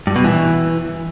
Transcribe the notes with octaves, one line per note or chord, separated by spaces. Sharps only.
G2
B2
E3